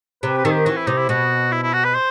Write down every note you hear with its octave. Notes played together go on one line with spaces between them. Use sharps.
C3 B4
B4
D#3 A4
G4
E3 F#4
E4
C3 D#4
E4
B2 F#4
E4
E4
F#4
B4
C5